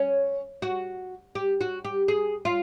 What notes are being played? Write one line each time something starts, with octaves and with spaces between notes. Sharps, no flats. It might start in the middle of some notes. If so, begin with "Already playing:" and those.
Already playing: C#4
F#4
G4
F#4
G4
G#4
F4